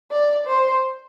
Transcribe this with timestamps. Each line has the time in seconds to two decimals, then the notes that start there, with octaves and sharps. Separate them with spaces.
0.11 D5
0.47 C5